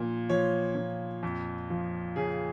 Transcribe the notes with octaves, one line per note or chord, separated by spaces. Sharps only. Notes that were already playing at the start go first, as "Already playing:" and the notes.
Already playing: A#2 F3
F3 C#5
A#2
F2
F3
C#3 G#4